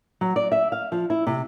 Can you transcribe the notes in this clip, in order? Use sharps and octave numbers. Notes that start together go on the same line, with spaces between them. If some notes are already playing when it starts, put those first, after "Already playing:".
F#3
D5
E5
F5
F3
E4
C3